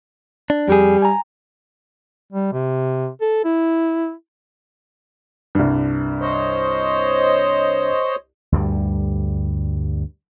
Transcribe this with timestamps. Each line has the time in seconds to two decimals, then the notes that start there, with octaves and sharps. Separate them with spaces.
0.50 D4
0.69 F2 G3 G#4
1.02 G#5 A#5
2.33 G3
2.52 C3
3.21 A4
3.44 E4
5.55 C2 G2
6.21 C5 C#5 D#5
8.52 D2 G2 G3